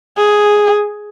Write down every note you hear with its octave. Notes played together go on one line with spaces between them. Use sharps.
G#4